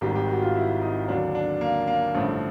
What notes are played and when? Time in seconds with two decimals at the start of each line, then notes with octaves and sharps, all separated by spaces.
0.01 G#1 G#2 D#3 G3 G4
0.15 G4
0.28 F#4
0.42 F4
0.55 E4
0.81 D#4
1.08 D#2 D3 F#3 D4
1.35 D4
1.61 A#3
1.87 A#3
2.15 A1 G2 D3 F3 A3